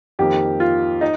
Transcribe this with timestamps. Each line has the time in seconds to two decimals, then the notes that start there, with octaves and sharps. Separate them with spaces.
0.19 F2 D#3 A#3 G4
0.60 F4
1.01 D#4